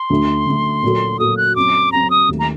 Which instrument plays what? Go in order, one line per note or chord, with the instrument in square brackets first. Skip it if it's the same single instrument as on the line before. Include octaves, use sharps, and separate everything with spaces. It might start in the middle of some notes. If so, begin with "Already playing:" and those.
Already playing: [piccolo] C6
[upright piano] D2 D3 A3
D2 D3 A3
A#2 F#3 A#3 F#4 A4
[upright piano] A#2 F#3 A#3 F#4 A4 [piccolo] D#6
[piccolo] F#6
[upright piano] F#2 F#3 C4 [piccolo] D6
[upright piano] F#2 F#3 C4 [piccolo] A#5
[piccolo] D#6
[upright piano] D#2 D#3 A3
[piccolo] A#5